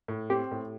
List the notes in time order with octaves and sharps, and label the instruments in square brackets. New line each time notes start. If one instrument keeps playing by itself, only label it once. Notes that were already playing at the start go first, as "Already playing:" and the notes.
[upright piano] A2
[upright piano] C4 [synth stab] G4
[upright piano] A2